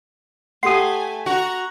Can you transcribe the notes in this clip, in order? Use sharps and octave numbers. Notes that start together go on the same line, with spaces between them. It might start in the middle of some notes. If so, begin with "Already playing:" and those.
A3 G4 A4 F#5 G#5 C6 D#6
F#4 A#5